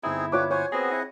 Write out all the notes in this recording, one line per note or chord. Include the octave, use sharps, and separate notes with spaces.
G1 C4 D#4 E4 G#4
D4 F4 G4 B4 C#5 D6
C5 C#5 F#5 G#5
B3 C4 F#4 G#4 D#5
E4 D#5 F#5